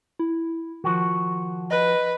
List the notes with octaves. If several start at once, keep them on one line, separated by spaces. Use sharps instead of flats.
E4
D#3 F3 F#4
B4 D#5